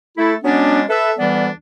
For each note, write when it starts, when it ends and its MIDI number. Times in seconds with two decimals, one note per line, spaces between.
0.18 0.35 57
0.18 0.35 64
0.18 0.35 69
0.44 0.82 54
0.44 0.82 56
0.44 0.82 59
0.44 0.82 61
0.44 0.82 62
0.89 1.11 69
0.89 1.11 71
0.89 1.11 76
1.18 1.50 38
1.18 1.50 52
1.18 1.50 55
1.18 1.50 59
1.18 1.50 62
1.18 1.50 74